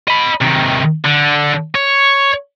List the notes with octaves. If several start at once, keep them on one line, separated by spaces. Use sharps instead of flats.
D#5 B5
C3 D#3
D3
C#5